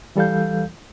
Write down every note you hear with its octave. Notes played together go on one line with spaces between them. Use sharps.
E3 G3 A4 F5 G6